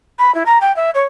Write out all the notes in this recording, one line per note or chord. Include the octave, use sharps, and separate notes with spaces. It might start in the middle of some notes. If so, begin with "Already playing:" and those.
B5
E4
A#5
G5
E5
C#5